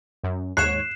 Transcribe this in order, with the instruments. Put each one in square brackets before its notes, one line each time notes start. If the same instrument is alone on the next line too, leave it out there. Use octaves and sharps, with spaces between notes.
[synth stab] F#2
[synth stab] D#2 G#2 C#5 [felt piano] F#6 [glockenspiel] C7 E7